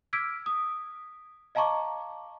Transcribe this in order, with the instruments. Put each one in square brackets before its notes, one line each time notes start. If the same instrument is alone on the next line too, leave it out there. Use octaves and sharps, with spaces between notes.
[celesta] D6 E6 F6 G#6 B6 D7
D#6
D#5 F5 A5 A#5 C#6 D6